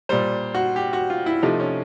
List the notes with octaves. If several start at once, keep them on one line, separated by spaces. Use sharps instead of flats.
A#2 G3 C5
F#4
G4
F#4
F4
E4
C3 F3 A3 D#4
C#4